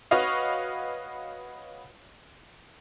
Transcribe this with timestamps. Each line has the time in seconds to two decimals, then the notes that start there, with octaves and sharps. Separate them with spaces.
0.11 F#4 B4 C#5 D#5 F5